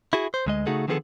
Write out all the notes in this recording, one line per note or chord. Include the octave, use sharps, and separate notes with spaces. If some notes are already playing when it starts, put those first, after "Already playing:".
E4 F#4 G#4
C5
D2 G#3 D#5
C#3 A3 D#4 F#4 G#4 A4
D3 D#3 F3 B3 G#4 A4